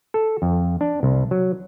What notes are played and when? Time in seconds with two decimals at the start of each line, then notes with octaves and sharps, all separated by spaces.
0.14 A4
0.42 F2
0.81 D4
1.03 C2
1.31 F#3